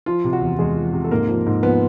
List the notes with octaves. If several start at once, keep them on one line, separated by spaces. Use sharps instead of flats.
F3 F4
C3
F#4
E2
E2 G#3 G#4
F3
C3
A4
G#2 A#3 A#4
F3
G#2
F3 B3 B4